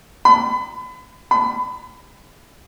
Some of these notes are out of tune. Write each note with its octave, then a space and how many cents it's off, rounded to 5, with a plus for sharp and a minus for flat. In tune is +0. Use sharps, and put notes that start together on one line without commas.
B5 +35
B5 +30